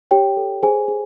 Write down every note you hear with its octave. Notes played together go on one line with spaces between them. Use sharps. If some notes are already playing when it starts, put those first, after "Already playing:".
G4 C#5 G5
A4
G#4 C5 G#5
G#4